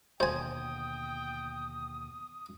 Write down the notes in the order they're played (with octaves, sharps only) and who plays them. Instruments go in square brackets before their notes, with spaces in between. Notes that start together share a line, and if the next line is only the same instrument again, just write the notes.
[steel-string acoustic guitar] D#2 B2 D3 [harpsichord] C5 G#5 [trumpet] G5 [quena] D#6